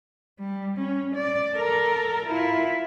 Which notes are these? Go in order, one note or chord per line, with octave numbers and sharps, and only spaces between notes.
G3
C#4
D5
A4 A#4
E4 F4